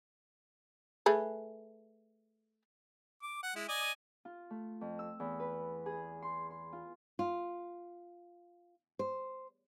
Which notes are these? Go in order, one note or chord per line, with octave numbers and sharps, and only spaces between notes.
A3 G#4 B4
D6
F#5
G#3 E4
D5 D#5 G#5
F4
A3
F2
E6
E2
B4
G#4
C6
C6
F4
F4
C5